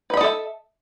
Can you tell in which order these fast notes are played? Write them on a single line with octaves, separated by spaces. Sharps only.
B4 B5 D#5 A4 E5